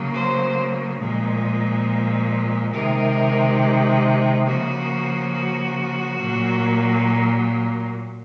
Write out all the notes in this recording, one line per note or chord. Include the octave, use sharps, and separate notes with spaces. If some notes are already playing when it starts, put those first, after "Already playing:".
Already playing: C#3 F#3 A#3
C5
A#2 F3 G#3
C3 D#3 G#3 A#4
C#3 F3 A#3 F#4
F#4
A#2 F#3 A#3